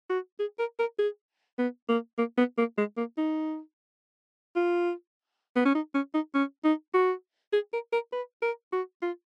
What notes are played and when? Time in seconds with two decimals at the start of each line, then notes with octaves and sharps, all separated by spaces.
0.10 F#4
0.39 G#4
0.59 A#4
0.79 A#4
0.99 G#4
1.58 B3
1.89 A#3
2.18 A#3
2.38 B3
2.58 A#3
2.78 G#3
2.97 A#3
3.17 D#4
4.56 F4
5.56 B3
5.65 C#4
5.75 D#4
5.94 C#4
6.14 D#4
6.35 C#4
6.64 D#4
6.94 F#4
7.53 G#4
7.73 A#4
7.93 A#4
8.13 B4
8.42 A#4
8.72 F#4
9.02 F4